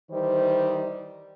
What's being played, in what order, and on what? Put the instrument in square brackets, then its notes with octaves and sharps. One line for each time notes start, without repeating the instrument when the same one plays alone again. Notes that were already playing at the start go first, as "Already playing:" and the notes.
[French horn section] D#3 E3 G3 C5